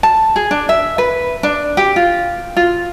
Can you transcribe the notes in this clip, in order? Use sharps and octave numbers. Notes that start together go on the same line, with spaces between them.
A5
G#4
D4
E5
B4
D4
G4
F4
F4